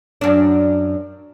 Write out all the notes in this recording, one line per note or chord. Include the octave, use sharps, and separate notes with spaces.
F#2 D4